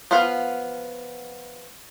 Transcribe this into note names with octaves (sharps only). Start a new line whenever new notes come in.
F3 B3 F4 F5